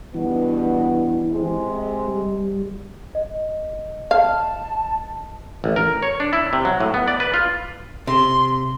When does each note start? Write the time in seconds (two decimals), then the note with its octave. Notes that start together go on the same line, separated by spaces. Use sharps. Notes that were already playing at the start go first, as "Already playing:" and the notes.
0.14 G2 B2 E3 B3
1.31 C3 G#3
2.08 G3
3.15 D#5
4.11 F5 A5
5.64 A1
5.76 A#4
6.03 C#5
6.20 D4
6.33 E4
6.53 C3
6.65 F#3
6.80 A2
6.94 B3
7.08 D5
7.20 B4
7.34 F4
8.07 C3 C6